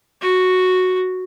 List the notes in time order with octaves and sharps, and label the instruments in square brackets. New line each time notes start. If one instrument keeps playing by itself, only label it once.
[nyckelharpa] F#4